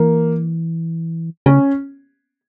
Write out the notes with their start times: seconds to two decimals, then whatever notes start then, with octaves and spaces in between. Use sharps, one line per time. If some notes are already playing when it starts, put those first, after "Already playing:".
Already playing: E3 A#3
1.46 C#3 C#4